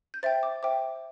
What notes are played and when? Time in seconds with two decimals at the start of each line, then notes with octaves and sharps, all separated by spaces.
0.14 G6
0.23 C5 E5 G5 A6
0.43 D6
0.63 C5 E5 G5 D6